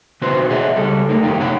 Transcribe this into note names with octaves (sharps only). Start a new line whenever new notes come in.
B2 E3 C#4 F#4 B4 C5
G#4 C#5 D#5 E5 F#5
C#2 G3 A4
A3 A#3 D#4 A#4
B1 F#2 D#3 F3 G4 F5
C2 C#4 C#5 F#5